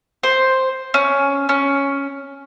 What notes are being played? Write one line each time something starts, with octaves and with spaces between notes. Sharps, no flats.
C5
C#4
C#4